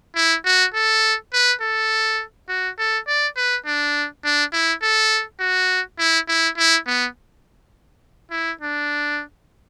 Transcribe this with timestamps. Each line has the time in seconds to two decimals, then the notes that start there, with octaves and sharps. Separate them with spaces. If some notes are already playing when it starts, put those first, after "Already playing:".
0.16 E4
0.45 F#4
0.74 A4
1.33 B4
1.61 A4
2.49 F#4
2.78 A4
3.07 D5
3.36 B4
3.66 D4
4.24 D4
4.53 E4
4.82 A4
5.40 F#4
5.99 E4
6.28 E4
6.57 E4
6.86 B3
8.31 E4
8.61 D4